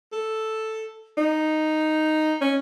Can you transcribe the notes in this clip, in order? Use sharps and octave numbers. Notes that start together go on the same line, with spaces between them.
A4
D#4
C#4